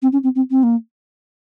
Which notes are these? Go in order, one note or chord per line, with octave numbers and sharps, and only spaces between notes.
C4
C#4
C4
C4
C4
A#3